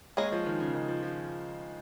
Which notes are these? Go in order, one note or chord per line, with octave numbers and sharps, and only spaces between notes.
G#3 A#3 C#4 G#4 D#5
F3
D#3
C#3
D#3
F3
F3